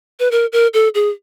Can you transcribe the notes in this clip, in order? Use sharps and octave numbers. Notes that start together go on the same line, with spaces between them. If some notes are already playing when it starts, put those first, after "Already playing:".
B4
A#4
A#4
A4
G#4